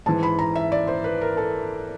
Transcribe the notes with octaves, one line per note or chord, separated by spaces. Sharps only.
G#2 E3 A5
B5
A#5
E5
D5
C5
B4
A#4
A4